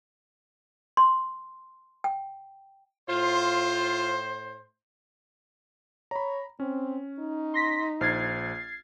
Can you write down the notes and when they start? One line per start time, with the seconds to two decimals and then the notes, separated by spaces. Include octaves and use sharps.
0.97 C6
2.04 G5
3.08 A2 F4 C5
6.11 C#5 A#5 B5
6.60 C4 C#4
7.19 D#4
7.54 C6 A#6 B6
8.01 A#1 C5 F6 G#6 A6 C7